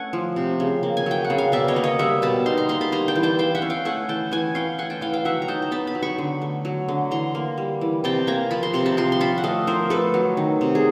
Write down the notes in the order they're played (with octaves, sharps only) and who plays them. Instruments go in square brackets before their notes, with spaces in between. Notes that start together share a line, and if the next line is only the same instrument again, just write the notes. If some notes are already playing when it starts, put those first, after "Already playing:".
Already playing: [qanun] A3 C#4 F#5 G#5
F3
C3
C#3
A#3
G#5
F#3 G5
F#5
C#3
F5
B2 D5 E5
C#5 D#5
A#3
C#5 D#5
G3 E5 F#5
B2 A5 B5
D#4 A#5 C6
A#5 C6
A#3 A#5 C6
A5 B5
G3 A#5 C6
G5 A5
E3
G5 A5
E3 F5 G5
E5 F#5
C#4
F5 G5
A3 F#5 G#5
E3 G5 A5
E3 F#5 G#5
C#4 F5 G5
A3 F#5 G#5
G5 A5
E3 F5 G5
F5 G5
F#3 E5 F#5
A#5
D#4 G5 A5
A#5
B3 A5 B5
A5 B5
F#3
B5 C#6
D3
A3
F#3
D3
E3 A#5 C6
A#3
G3
E3
C3 G5 A5
A#3 G#5 A#5
F3 A5 B5
A#5 C6
C3 A#5 C6
A5 B5
F3 A#5 C6
C6
C#4 A5 B5
F#5
A3 D#5 F5
F3 A#4 C5
A3 A4 B4
F#3
D#3
C3
G#4